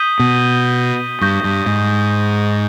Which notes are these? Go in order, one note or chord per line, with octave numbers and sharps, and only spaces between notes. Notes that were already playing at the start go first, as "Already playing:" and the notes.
Already playing: D#6 G6 B6 D#7 G7
B2
G2 C#6 G6 A#6
G2
G#2